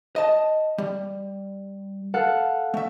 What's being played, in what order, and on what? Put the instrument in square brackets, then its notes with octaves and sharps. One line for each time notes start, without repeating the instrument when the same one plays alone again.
[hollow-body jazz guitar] D#5 A5
G3
[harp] A4 F5 F#5
[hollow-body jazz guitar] A3 E5